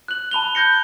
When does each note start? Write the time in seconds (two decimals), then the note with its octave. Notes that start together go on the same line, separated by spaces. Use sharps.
0.08 F#6 F#7
0.31 A5 B5 F7 G7
0.55 F#6 G6 A#6 C#7